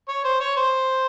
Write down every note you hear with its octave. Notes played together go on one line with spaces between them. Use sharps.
C#5
C5
C#5
C5